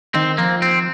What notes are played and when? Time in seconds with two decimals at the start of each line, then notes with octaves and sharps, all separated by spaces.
0.15 D#3 C4
0.38 F3 A#3
0.62 C4